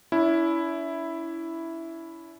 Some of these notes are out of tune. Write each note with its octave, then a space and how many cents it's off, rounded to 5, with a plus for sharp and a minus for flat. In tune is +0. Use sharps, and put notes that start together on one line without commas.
C#4 +45 E4 +0